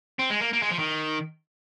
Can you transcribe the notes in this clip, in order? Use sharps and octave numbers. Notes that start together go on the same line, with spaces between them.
C4
G#3
A#3
A#3
G#3
F3
D#3